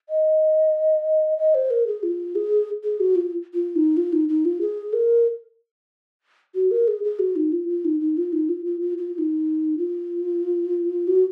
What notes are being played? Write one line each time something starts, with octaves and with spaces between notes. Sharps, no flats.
D#5
D#5
C5
A#4
G#4
F4
G#4
G#4
F#4
F4
F4
D#4
F4
D#4
D#4
F4
G#4
A#4
F#4
A#4
G#4
G#4
F#4
D#4
F4
F4
D#4
D#4
F4
D#4
F4
F4
F4
F4
F4
D#4
F4
F#4